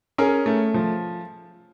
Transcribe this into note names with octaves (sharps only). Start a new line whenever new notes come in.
C#4 G#4 A#4
A3
F3